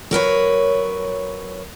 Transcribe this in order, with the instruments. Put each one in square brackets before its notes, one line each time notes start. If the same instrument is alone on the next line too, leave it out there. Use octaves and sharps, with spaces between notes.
[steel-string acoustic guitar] F#3 A#4 B4 C#5